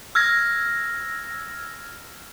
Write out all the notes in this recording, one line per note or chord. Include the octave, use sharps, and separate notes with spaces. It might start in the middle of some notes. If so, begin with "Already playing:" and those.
E6 F6 G#6 A#6